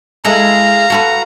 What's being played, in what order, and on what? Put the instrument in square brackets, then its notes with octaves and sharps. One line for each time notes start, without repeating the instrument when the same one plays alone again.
[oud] G#3 E4 A4 [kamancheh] F5 [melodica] A#5
[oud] F#4 A4 B4